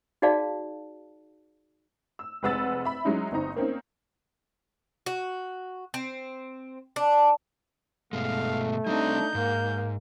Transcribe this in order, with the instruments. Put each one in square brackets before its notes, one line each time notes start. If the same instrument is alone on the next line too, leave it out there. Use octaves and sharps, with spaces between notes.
[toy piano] D#4 F#4 G#4 D5 F5 A5
[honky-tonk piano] E6
F1 G#3 B4 F#5 E6 A6
E5 B5
F#3 G#3 C#4 D#4 E4
G1 C4 D#4 A#5
A#3 C4 C#4 D#4
[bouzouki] F#4
C4
D4
[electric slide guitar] G2 B2 G#3 [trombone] A3 [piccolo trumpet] F5
[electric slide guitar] G3 C4 [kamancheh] D4 D#4 [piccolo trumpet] G6
[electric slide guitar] G#2 [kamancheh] A#3